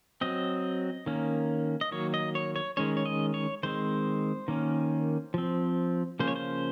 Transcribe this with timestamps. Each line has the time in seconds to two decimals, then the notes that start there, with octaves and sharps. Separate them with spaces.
0.21 F#3 C4 D#5
1.06 D#3 A#3 C#4
1.81 D#5
1.91 D#3 F#3 A#3 C#5
2.14 D#5
2.35 C#5
2.56 C#5
2.77 D#3 G#3 C#4 C#5
2.97 C#5
3.06 D#5
3.34 C#5
3.63 D#3 G#3 C4 C5
4.48 D#3 A#3 C#4
5.34 F3 C4
6.19 C#3 F3 A#3 C#4 C5
6.28 C#5
6.36 C5